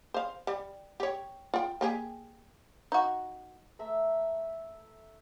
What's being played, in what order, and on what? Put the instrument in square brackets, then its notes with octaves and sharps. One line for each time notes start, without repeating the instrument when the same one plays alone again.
[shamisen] C5 F5
G3
G4 C#5
F4 G5
A#3 G4 G#4
D#4 F#4
[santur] A3 E5 A#5 E6